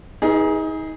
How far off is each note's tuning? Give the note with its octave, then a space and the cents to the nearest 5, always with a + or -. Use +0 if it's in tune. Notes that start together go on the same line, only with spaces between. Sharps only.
D#4 +30 G#4 -10 B4 -30